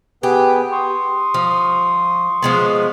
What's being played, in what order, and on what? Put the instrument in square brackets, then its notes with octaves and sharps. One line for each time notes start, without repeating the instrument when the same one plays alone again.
[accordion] B3 G#4 B4 [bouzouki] G4
[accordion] C6 C#6 D#6
[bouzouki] F3
F3 G#3 B3